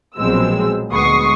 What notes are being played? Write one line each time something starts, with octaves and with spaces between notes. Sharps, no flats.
A#1 B2 F#3 G#3 C4 E6
D2 G#3 B3 C#6 D#6 C7